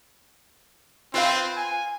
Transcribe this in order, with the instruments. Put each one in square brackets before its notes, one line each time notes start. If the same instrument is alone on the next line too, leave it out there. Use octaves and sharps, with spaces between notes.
[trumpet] C4 [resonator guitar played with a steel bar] F4 B4 F5
[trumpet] G#5